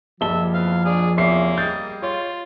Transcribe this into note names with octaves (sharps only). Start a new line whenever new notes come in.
F#1 F3 G3 E5 A5 G7
E2 C4 B4 F5
D4 F4 G#4 D5
E2 C3 A#3 C#4 F4 E5 C7
G3 G#4 D#5 G6 A6
F4 C#5